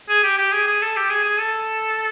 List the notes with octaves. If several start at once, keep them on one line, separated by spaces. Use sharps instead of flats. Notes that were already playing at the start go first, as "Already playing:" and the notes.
G#4
G4
G4
G#4
G#4
A4
G4
G#4
G#4
A4